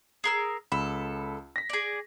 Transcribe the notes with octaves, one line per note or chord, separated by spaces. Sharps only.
G#4 A#4 E6
C#2 A4 B5
A#6 B6
G#4 D5